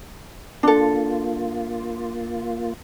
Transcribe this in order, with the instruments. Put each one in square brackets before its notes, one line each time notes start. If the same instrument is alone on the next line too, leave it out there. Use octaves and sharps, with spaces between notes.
[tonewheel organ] A#3 F4 [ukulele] D4 A4